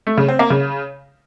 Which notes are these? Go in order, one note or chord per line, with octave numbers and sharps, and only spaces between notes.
A3
C#3
C4
A#3
C#3